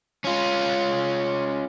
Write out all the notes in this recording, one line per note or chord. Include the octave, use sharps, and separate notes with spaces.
C#4 F4